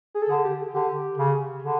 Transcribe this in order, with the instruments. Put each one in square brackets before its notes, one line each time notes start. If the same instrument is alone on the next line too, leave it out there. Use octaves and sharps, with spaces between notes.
[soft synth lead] G#4
A4
[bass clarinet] D3 [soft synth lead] G#4
[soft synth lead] G4
[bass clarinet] D3 [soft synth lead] G4
[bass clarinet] C#3
D3